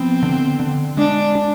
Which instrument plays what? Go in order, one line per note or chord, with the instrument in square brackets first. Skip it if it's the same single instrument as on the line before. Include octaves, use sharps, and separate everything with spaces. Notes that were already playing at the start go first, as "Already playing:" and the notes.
Already playing: [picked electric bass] F3 B3 [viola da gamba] C4
[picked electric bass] D3
D3
[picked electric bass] G#3 [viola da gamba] D4
[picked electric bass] D4